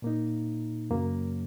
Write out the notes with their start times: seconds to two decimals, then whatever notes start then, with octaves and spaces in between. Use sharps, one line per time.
0.02 A#2 A#3 D#4
0.90 F#2 C#3 F#3 A#3